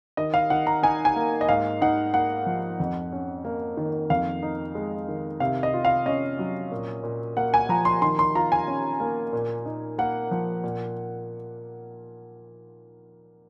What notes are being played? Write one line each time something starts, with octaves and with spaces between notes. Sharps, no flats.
D#3 D#5
F5
D#3 F#5
A#5
D#4 G#5
G#5
A#3
D#5
G#2 F5
D#4 F#5
A#3 F#5
F3
F2
C#4
A#3
D#3
F2 F5
D#4
G#3
D#3
C3 F5
D#5
F4
F5
C#4 D#5
F#3
A#2
A#2
A#3 F#5
G#5
F3 A#5
C6
D#3 C6
C6
F4 A#5
G#5
C#4
A#3
A#2
D#4
A#3 F#5
F3
A#2